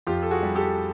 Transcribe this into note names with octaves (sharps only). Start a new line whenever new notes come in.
F2 F4 G4
A4
F#4 G#4
G3
G4 A4